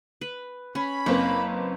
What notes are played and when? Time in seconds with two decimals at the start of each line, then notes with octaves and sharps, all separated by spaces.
0.21 B4
0.75 C#4 B5
1.06 F#1 A#3 C4 B4